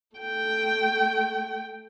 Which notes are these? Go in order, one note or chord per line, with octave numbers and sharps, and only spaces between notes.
A3 G5